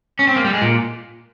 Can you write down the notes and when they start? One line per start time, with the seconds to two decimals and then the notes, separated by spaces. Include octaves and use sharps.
0.19 C#4
0.27 C4
0.36 A#3
0.44 G3
0.53 G#3
0.61 A#2